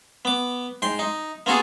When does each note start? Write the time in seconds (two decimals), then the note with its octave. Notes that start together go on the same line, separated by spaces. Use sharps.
0.25 B3 D6
0.82 G#2 G5 C6
0.99 D#4
1.46 A#3 B3 F4 F#4 G#4 A4